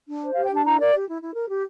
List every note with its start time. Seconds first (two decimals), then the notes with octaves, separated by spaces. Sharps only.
0.09 D4
0.22 C5
0.32 F5
0.37 G4
0.43 G5
0.51 D4 A5
0.64 E4 A#5
0.78 A#4 D5
0.93 G4
1.07 E4
1.21 E4
1.35 A#4
1.50 G4